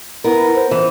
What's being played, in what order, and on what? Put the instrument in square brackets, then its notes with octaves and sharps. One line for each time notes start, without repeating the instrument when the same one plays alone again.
[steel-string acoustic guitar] B3 A#4 [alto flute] E4
[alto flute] C5
[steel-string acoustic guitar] E3